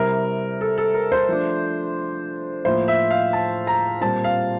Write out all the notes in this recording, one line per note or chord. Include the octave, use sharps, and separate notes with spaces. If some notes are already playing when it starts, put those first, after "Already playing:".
Already playing: C3 G3 C4 E4 A#4
A4
A4
A#4
C5
F3 A3 D4
A2 F3 A#3 E4 C5
E5
F5
A5
A#5
A#2 G3 C4 F4 A5
F5